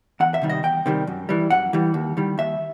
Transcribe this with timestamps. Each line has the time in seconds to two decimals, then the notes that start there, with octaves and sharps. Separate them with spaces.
0.20 E2 F#5
0.34 E5
0.42 C3 D#3 G3
0.49 D#5
0.63 E2 G5
0.86 C3 D#3 G3
1.07 F#2
1.29 E3 G3
1.50 F#2 F#5
1.73 E3 G3
1.94 D#2
2.17 D#3 G3
2.38 D#2 E5